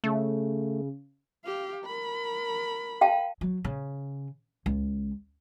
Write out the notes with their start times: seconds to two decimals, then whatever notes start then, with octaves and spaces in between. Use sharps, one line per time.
0.04 C#3 A3
1.44 G4 F5
1.84 A#4 B5
3.01 F5 G5 A5
3.41 F#3
3.64 C#3
4.66 C#2